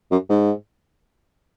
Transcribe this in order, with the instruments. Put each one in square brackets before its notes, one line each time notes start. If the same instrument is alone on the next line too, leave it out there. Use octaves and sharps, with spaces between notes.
[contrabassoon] F#2
G#2